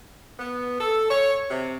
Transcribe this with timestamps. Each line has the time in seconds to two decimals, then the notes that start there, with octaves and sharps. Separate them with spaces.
0.39 B3
0.78 A4
1.09 C#5
1.49 C3